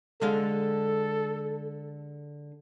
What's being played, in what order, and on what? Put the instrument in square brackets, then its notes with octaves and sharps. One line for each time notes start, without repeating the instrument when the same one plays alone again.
[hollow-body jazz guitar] D3 G#3 F5 [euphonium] A4